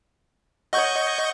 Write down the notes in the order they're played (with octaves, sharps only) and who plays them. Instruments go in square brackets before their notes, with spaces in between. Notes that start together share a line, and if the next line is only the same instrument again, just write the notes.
[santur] C#5 F#5 [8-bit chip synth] D#5 C#6 G6